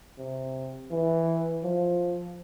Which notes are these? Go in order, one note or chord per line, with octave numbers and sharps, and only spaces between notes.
C3
E3
F3